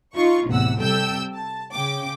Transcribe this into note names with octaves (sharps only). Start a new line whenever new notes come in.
D#4 F4 C#6
A1 E2 C3 F#5 E6
C3 G3 A4 G5 E6 G6
A5
C#3 G5 D6